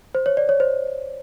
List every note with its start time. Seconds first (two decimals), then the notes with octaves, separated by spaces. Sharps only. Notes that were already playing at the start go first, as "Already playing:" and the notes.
0.15 C5
0.26 C#5
0.37 D5
0.49 C#5
0.60 C5